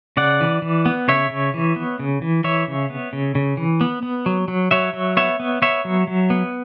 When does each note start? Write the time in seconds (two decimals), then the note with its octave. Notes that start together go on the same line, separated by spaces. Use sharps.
0.17 C#3 D5 F#5
0.41 E3
0.62 E3
0.86 B3
1.08 C#3 C#5 E5
1.30 C#3
1.54 E3
1.76 B3
1.99 C#3
2.22 E3
2.44 E3 C#5 E5
2.68 C#3
2.90 B3
3.13 C#3
3.35 C#3
3.57 E3
3.81 B3
4.03 B3
4.26 F#3
4.48 F#3
4.71 F#3 C#5 E5
4.93 F#3
5.17 B3 C#5 E5
5.40 B3
5.62 B3 C#5 E5
5.85 F#3
6.07 F#3
6.30 B3